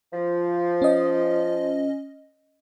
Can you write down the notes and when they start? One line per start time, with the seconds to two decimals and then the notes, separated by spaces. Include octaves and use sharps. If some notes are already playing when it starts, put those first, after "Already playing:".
0.12 F3
0.82 C#4 D#5